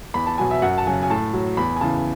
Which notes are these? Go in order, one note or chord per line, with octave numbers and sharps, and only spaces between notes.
E2 B5
A5
B2 F#3 G#5
E5
F#2 F#5
A5
C#3 F#3 G#5
G#5
A2 A5
F#3
E2 B5
G#5
C#3 E3 A5